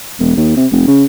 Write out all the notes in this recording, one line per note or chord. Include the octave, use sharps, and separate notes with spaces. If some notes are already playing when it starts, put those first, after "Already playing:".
E1
D#2
C3
F1
C#3